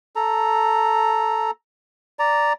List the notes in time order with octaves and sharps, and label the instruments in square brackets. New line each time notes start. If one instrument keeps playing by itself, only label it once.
[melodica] A4 A#5
D5 A#5